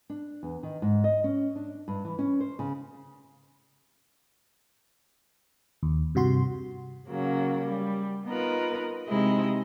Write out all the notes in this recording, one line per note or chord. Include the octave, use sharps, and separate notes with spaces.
D4
E2
D#3
G#2
D#5
C#4
D4
G2
E3
C#4
C5
C#3
D#2
G2 C3 F#4 C6
C#3 F#3 A#3
G3
B3 D#4 F4 A#4 B4
C3 G#3 D#4 E4 D#5